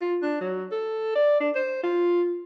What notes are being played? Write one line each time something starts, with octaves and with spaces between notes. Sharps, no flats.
F4
D4
F#3
A4
D5
D4
C5
F4